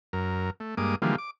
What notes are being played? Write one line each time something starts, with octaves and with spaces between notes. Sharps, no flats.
F#2 A#4
A3
G2 G#3 A#3 D6 D#6
D3 E3 F3 G3 G#3 A#3
D6